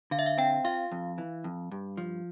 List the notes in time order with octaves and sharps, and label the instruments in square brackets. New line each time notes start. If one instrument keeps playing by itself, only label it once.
[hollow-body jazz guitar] D3 [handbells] F5
[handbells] E5
F5
[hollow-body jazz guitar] C4 [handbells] G5
[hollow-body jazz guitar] F4 [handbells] F5
[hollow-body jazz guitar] F2
E3
F2
G2
F3